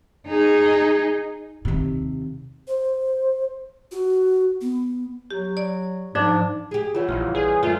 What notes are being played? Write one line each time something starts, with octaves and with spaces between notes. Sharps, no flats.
D#4 G#4
D#2 C3
C5
F#4
B3
F#3 G4
D5
G#2 F3 D4
G4 G#4
E3 G3 F4 C#5 F#5
A#1 F5 C6 F6
G#4 B4 C#5 D5
F#2 D3 A3 F4